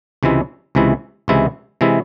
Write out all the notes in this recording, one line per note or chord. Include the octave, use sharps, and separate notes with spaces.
C#2 C3 E3 G#3 E4
C#2 C3 E3 G#3 E4
C#2 C3 E3 G#3 E4
C3 E3 G#3 E4